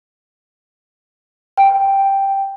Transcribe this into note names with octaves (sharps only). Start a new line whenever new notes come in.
G5